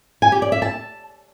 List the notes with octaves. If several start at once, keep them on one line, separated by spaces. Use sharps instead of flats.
G#5
G4
D5
E5
A5